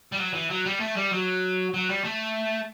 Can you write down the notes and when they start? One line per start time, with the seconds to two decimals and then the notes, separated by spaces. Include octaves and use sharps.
0.12 G3
0.19 F#3
0.33 E3
0.50 F#3
0.65 G3
0.80 A3
0.96 G3
1.11 F#3
1.74 F#3
1.89 G3
2.04 A3